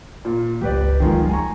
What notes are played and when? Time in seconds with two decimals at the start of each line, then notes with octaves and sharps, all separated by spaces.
0.25 A#2
0.61 G1 C#2 G4 B4 D5
1.00 C#2 D#3 F#3 G#3 F4
1.29 E3 G#5 A#5 C#6